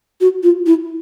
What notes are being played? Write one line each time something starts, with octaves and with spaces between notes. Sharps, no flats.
F#4
F4
E4